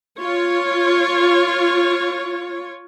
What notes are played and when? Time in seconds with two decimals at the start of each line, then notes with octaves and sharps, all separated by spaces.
0.20 F4 C#5